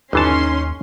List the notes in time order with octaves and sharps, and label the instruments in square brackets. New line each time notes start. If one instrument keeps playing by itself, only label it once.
[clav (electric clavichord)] G1 E3 A5 [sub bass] D#2 [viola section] C#4 C6 [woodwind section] D#4